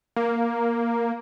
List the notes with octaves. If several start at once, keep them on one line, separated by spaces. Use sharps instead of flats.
A#3